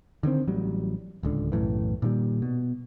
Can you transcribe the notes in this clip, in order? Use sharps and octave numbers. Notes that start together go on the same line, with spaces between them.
D3 D#3 G#3 C4
A1 F#3 G3
D1 C#2 D3
B1 F#2 A2 E3
A#2 D#3 E3 G3
B2